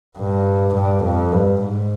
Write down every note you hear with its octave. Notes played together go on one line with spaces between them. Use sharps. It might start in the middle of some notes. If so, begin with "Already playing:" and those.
G2
G2
F2
G2
G#2